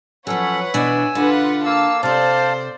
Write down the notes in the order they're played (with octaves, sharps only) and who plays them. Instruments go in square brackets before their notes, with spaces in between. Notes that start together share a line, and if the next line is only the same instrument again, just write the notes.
[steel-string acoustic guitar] F3 F#3 [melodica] C#4 A4 [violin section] B4 C#5 F#5
[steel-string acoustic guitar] B2 E3 D4 [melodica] G#5 E6
[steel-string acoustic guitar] D3 [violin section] F4 B4 F#5
[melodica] A#3 F5 [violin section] A5 E6
[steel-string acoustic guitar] C3 A4 [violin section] C5 D5 [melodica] F5 A5